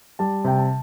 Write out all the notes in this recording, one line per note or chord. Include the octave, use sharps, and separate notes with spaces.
G3 A5
C3 G5
A5